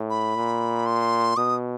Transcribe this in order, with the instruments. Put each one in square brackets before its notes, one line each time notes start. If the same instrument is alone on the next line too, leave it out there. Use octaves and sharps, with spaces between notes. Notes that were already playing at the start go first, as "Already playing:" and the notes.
Already playing: [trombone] A2
[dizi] B5
[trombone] A#2
[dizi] C6
[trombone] B2 [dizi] D#6